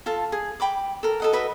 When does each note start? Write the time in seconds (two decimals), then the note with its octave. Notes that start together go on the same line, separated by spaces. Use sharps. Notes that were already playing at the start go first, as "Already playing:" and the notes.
0.06 F4 A4 A5
0.32 G#4
0.60 G5 B5 D6
1.03 A4 A#4
1.20 A4 D#5 F#5
1.33 F#4 B4 D#5 E5